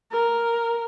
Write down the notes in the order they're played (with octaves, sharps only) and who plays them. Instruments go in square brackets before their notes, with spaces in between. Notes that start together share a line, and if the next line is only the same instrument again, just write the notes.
[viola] A#4